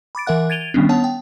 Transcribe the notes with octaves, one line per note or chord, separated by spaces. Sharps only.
B5 D6 A6 D7
E3 A#4 E5 F#5 F#6
G#6 A6 D7 D#7 F7 G7
D#3 G3 B3 C#4 D4
B3 C#5 F#5 A5
G5